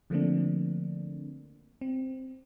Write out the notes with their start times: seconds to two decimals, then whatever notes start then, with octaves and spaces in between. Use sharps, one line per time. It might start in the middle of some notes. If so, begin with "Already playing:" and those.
0.10 D3 F3 A3 A#3 C4 D4
1.81 C4